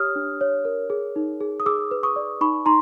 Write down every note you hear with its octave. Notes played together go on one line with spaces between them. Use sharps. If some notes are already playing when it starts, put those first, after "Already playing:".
Already playing: G4 C#5 D#6 F6
D4
C#5
A#4
G#4
D#4
G#4
D#6
G#4 D6 E6
B4
C#6 D#6
D5
D#4 B5 C#6
D#4 A#5 C6